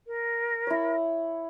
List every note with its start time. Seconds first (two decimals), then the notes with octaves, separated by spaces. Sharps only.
0.07 A#4
0.67 E4 C#5